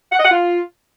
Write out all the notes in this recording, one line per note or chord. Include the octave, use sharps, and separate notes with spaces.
F#5
D#5
F#5
F4